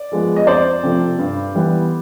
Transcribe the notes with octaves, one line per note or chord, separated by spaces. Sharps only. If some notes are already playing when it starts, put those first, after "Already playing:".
Already playing: D5
F3 G#3 B3
D#5
F2 C5 D5
C3 F3 A3
G2
E3 G3 B3